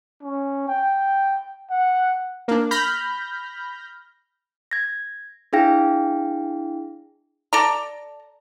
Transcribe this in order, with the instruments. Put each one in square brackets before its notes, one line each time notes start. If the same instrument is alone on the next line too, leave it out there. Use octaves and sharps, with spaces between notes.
[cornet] C#4
G5
F#5
[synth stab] A#3 D4
B5 F6 G6 A#6
[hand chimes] G#6 A#6
D4 E4 G#4 F5 G5 A#6
[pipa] A4 D5 A#5